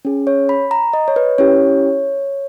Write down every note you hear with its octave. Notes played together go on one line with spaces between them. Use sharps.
C#4 G#4
C#5
B5
A#5
D#5
C#5
B4
C#4 E4 G4 C#5